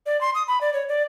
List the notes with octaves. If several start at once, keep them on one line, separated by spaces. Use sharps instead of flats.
D5
C6
D#6
B5
D5
C#5
D5